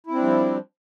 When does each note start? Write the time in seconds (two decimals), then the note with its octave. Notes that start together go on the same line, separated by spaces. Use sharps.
0.07 E4
0.11 C4
0.15 D4
0.19 G3
0.24 F3